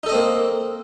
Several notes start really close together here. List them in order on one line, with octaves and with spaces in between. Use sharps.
D#4 A4 D#5 C4 A#3